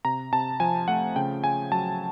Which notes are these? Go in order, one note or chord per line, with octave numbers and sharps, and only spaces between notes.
C3 A#5
C3 A5
F3 G#5
A3 F#5
C#3 G5
C#3 G#5
F#3 A5